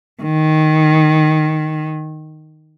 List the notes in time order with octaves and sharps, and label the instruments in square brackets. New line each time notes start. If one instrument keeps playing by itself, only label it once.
[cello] D#3